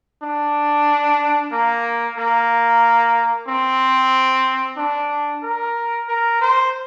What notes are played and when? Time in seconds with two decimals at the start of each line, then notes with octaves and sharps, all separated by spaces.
0.23 D4
1.52 A#3
2.18 A#3
3.48 C4
4.77 D4
5.43 A#4
6.08 A#4
6.41 C5